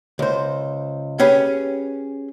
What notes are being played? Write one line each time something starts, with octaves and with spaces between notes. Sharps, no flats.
C#2 C5
C#4 G4 G#4 B4